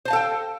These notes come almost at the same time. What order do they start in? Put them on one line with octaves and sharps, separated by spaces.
C5 A5 F5 A4 G5